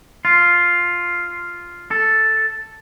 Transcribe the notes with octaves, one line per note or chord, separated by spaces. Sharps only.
F4
A4